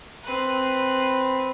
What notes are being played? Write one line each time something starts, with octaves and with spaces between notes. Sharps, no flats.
C4 B4